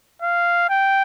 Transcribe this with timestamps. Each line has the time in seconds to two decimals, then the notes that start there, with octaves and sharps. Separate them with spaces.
0.22 F5
0.69 G5